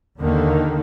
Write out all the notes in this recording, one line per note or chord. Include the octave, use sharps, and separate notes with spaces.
D#2 D3 D#3 A#3